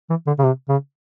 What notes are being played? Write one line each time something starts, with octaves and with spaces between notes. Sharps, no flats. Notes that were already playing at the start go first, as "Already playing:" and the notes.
E3
D3
C#3
C3
C#3